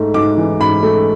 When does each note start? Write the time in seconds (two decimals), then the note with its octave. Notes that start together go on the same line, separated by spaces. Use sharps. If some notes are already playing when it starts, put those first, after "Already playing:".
Already playing: G#2 A3
0.14 G#2 D6
0.37 E3
0.60 G#2 B5
0.83 A3